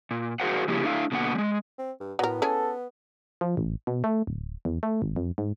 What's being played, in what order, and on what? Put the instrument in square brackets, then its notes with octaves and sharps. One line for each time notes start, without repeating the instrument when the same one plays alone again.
[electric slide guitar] A#2
F#4 G#4 A#4 C5 F5 F#5
C#3 F3 A#3 E4 G4 G#4
A3 D4 E4 D5 F5
B2 D3 A#3 B3 F#5
G3 G#3
[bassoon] C4
G2
[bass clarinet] A2 [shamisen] F#3 A#4 [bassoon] B3
[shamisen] C#4 E4 G#4 [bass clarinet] A4
[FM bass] F3
A1
B2
A3
D1
E2
A3
G#1
F2
G#2